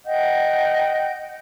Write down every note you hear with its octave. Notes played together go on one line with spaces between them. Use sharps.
D#5 F#5 G5 G6